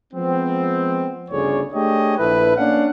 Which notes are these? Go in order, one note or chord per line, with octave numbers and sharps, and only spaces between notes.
F3 G#3 B3 C4
G1 D2 C#3 G#4 C#5 D5
A3 D4 G4 G#4 C#5 D#5
A#1 E4 A4 B4
A#3 C#4 D4 D5 F5 F#5